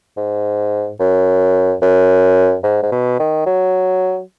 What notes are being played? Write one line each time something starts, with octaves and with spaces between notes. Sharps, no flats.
G#2
F#2
F#2
G#2
G#2
B2
D#3
F#3